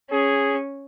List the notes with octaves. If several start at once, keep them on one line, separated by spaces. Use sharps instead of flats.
C#4 G#4